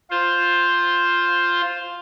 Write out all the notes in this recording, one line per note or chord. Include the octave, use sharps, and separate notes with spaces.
F4 C5